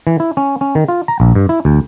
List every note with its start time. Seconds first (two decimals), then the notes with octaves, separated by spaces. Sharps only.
0.07 E3
0.20 E4
0.37 C#4
0.61 C#4
0.75 D#3
0.88 F4
1.08 A#5
1.20 A#1
1.35 G2
1.49 E4
1.65 D2